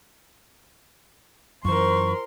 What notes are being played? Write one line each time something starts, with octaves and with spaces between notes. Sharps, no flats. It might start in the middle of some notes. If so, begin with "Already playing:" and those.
F#2 E3 F4 A#4 C5 C6 C#6